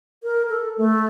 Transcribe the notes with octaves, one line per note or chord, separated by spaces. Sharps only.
A#4
A4
A3